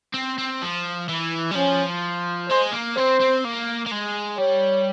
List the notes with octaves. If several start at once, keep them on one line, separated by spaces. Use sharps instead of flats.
C4
C4
F3
E3
G3
F3 C#4
G#3 C5
A#3
C4 C5
C4
A#3
A#3
G#3
G3 C#5